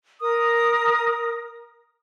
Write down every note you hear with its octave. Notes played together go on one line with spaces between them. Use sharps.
A#4 D#6